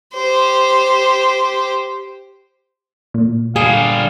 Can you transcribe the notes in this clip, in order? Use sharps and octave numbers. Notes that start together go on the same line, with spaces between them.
G4 C5
A#2
D3 G3 G#4 F5